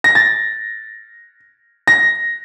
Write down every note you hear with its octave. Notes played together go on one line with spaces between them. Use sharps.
A#6
A6
A#6